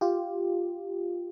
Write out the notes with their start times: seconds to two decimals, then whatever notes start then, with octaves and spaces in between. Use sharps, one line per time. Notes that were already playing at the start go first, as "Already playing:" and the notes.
0.01 F4 G4